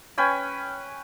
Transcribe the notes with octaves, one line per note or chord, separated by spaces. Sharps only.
C#4 B4 G5 G#5